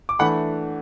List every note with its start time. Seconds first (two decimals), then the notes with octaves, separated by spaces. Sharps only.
0.09 D6
0.19 E3 A3 D4 F#5 B5